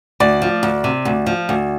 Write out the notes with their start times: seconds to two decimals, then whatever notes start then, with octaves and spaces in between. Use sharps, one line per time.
0.20 D2 D5
0.42 F3
0.63 D2
0.84 C3
1.05 D2
1.26 F3
1.49 D2